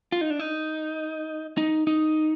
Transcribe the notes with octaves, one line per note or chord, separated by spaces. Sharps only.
F4
D#4
D4
D#4
D#4
D#4